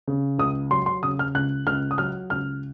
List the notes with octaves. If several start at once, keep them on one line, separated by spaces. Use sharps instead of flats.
C#3
C#2 D#6
F#3 C6
C6
C#3 D#6
F6
C#2 F#6
C#2 F6
D#6
F#3 F6
C#2 F6